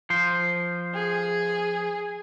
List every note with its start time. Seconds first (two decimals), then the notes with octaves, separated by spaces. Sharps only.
0.10 F3 C5
0.95 G#4